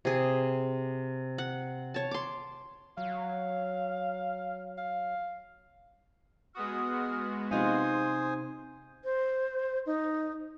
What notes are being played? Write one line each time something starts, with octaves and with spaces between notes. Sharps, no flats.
C3 G#4
F#5
C#5 A5
C6 D6
F#3 F5
F5
G#3 B3 F#4 D#6 F6
C3 D#4 F4 C5 G#5 C6 D#6
C5
D#4